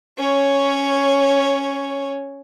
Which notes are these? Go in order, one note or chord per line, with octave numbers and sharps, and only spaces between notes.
C#4 C#5